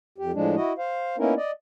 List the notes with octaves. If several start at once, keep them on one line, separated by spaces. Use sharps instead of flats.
F2 G4
A2 F3 G#3 D4
E4 F#4 D#5
C5 F5
A#3 B3 C#4 D#4 E4 A#4
D5 D#5